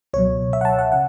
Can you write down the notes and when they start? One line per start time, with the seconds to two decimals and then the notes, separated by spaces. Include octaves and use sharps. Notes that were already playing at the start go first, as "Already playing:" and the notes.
0.13 C#2 B2 F#3 C#5
0.53 E5
0.61 F#5
0.65 A5
0.79 F#5
0.92 C#3 F#5